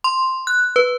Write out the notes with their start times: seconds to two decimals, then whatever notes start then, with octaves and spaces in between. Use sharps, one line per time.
0.04 C6
0.47 F#6
0.76 B4